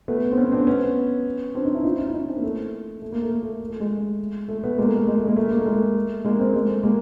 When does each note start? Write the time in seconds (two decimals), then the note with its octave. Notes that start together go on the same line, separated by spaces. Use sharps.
0.08 A3 B3
0.31 C4
0.37 B3 C#4
0.52 C4 D4
0.67 B3 C#4
1.55 C4 D4
1.65 C#4 D#4
1.74 D4 E4
1.84 D#4 F4
1.99 C#4 D#4
2.07 E4
2.14 C#4 D#4
2.28 C4 D4
2.37 A#3
2.43 A3
3.02 A3
3.12 A#3
3.22 A3
3.32 A#3
3.43 A3
3.70 A3
3.80 G#3
4.48 A3
4.64 A3 B3
4.78 G#3 A#3
4.87 A3
4.98 A3
5.07 G#3
5.18 A3
5.27 G#3 A#3
5.36 A3
5.51 A#3
5.59 A3
5.66 G#3
5.74 A3
6.24 G#3 A#3
6.39 A#3 C4
6.55 G#3
6.69 A3
6.83 G#3 A#3